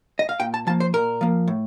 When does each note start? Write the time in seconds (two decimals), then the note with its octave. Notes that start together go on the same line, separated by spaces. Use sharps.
0.19 D#5
0.29 F5
0.40 A#2 G5
0.54 A5
0.67 F3 A#3 A5
0.80 C5
0.94 A#2 A#4
1.21 F3 A#3
1.48 A2